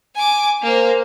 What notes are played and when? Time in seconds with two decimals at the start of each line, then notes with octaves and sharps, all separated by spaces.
0.15 G#5 D6
0.63 A#3 C5